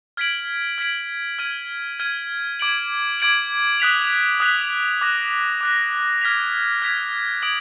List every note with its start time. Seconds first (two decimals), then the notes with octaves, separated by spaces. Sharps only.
0.17 F6 G#6 B6 D7 F#7
0.78 F6 G#6 B6 D7 F#7
1.39 F6 G#6 D#7
2.00 F6 G#6 D#7
2.59 D6 G#6 D7 F#7
3.20 D6 G#6 D7 F#7
3.80 D#6 F#6 B6 F7
4.40 D#6 F#6 B6 F7
5.01 D6 F#6 A#6
5.61 D6 F#6 A#6
6.22 F6 G#6 B6 F7
6.82 F6 G#6 B6 F7
7.42 D#6 G#6 D7 F#7